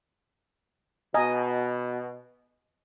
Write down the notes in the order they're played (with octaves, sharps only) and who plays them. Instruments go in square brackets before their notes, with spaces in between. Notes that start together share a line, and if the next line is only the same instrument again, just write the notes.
[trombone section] B2 [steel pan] D#5 G#5 A#5